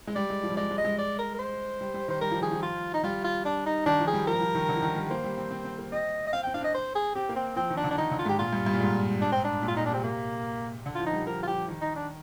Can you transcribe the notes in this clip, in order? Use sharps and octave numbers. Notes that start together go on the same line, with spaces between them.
G#3
G3 D5
G#3
F3
G3
G#3 D5
G#3
D#5
G#3
D5
A#4
A#4
C5
G3
G3
D#3 C5
G3 A#4
F3
D#3 G#4
F3
F4
D#4
G3 F4
F4
D4
D#4
D#3 D4
F3
G#4
G3
F3 A#4
G3
F3
D#3
D3
F3
D#3
G3
A#3 C5
G3
C4
C4
C4
A#3
C4 D#5
D#5
C4 F5
C4 G5
D4 F5
C4 D#5
C5
G#4
C4 G4
A#3
C4
F3 C4
D#3
D4
D3
D4
D#3 D#4
D3
F4
G#2 G4
A#2 F4
G2
G2
A#2
G#2
D4
C4
D4
A#2
F4
A#2 D#4
D4
C3 C4
A#3
D3
F3 F4
D#4
G3
F3 A#4
F4
F3 G4
D#3
D#4
D4